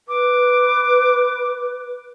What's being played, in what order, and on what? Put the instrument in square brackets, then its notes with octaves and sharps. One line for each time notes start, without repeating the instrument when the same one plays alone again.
[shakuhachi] B4 [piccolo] D6